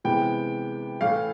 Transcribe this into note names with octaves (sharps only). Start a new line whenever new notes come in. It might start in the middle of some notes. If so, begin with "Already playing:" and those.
C3 E3 G#3 B3 G5
A2 E3 A3 F5